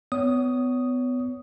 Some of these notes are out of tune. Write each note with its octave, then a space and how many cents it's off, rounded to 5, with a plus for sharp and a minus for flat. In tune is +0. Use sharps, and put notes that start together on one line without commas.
B3 +30 C#5 +25 D#6 +0